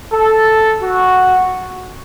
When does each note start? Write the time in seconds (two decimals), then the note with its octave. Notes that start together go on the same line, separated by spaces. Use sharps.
0.13 A4
0.81 F#4